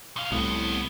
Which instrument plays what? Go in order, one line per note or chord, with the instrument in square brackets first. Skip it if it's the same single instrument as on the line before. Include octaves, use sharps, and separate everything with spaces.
[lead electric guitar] B1 F5
[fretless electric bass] C2 A2 [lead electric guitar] F3 B3